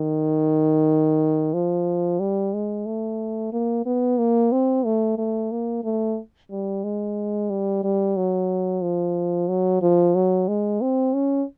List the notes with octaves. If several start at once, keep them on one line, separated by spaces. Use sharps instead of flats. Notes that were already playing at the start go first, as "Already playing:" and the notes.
Already playing: D#3
F3
G3
G#3
A3
A#3
B3
A#3
C4
A3
A3
A#3
A3
G3
G#3
G3
G3
F#3
F3
F#3
F3
F#3
G#3
C4
C#4